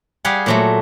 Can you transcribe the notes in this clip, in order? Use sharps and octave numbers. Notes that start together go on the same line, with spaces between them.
G3 G4 G#4 F5 F#5
A#2 F#3 A3